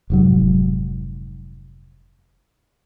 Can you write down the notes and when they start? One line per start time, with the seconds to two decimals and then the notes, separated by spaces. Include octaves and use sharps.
0.10 F1 G#2 F#3